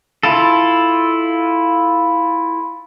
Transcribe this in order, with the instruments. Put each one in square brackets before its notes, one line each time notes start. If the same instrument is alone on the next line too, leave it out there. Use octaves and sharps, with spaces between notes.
[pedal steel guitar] E4 F4 A4